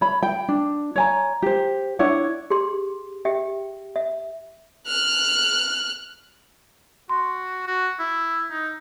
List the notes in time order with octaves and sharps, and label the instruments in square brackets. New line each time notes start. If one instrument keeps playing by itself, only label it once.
[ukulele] C#5 B5
G5
D4
C#5 G#5 A#5
G4 C5
D4 E4 C#5 F#5
[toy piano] G4 G#4 C6
G4 E5 G5
E5
[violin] F6 F#6
[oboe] F#4 [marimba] C6
[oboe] F#4
E4
D#4